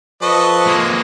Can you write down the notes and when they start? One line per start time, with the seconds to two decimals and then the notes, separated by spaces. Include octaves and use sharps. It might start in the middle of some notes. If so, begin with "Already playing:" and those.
0.22 F3 A4 B4 D#5 C#6
0.67 G#3 A#3